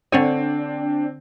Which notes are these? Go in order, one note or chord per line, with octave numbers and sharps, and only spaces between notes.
D3 C4 D4 C#5 G#5